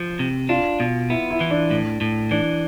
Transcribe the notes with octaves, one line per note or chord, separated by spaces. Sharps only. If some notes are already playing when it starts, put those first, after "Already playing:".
Already playing: F3
C3
D4 F4
B2
B3 E4
E4
E3
D4
A2
A2
E3 D4